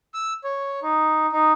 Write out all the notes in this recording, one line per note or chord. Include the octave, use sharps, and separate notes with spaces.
E6
C#5
D#4
D#4